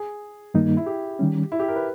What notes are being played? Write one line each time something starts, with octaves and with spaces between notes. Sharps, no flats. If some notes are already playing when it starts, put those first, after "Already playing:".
Already playing: G#4
G2 D#3 G3 A#3 D#4
E4
G4
D#3 G3 C#4
E4
G4
A#4
B4